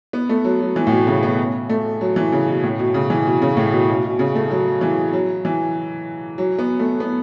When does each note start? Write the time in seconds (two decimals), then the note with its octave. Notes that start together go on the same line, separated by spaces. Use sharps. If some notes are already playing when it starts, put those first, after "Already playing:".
0.13 B3
0.29 A3
0.44 F#3
0.61 F#3
0.76 E3
0.87 A2
0.91 B2
1.07 C#3
1.23 B3
1.69 A3
2.01 F#3
2.16 E3
2.32 C#3
2.47 B2
2.63 A2
2.79 B2
2.94 C#3
3.10 E3
3.26 B2
3.42 C#3
3.57 A2
3.72 B2
3.88 B2
4.04 B2
4.19 C#3
4.35 A3
4.51 F#3
4.81 E3
5.13 F#3
5.45 E3
6.38 F#3
6.59 B3
6.79 A3
7.00 B3